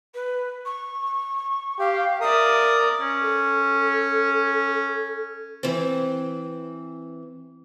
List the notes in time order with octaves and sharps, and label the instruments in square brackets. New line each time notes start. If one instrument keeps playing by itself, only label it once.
[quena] B4
C#6
[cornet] G4 [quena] F5
[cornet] A#4 [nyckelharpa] D5 D#6 [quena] E5
[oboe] C#4
[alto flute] A4
[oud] E3 C4